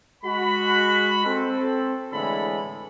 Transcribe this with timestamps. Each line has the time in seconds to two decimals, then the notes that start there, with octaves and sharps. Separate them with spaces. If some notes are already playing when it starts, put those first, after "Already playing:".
0.24 G#3 F#4 B5
1.25 C4 A4
2.12 A2 D3 E3 G#3 A4 B5